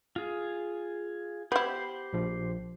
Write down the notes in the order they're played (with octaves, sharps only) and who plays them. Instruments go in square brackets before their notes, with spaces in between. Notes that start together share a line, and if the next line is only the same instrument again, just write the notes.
[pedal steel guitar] F4 G#4
[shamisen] B3 E4 [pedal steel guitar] G4 C5 B5
[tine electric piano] A#1 F3